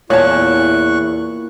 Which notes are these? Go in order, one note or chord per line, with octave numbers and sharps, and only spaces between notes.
E2 A#2 E4 C#5 A5 C#6 F#6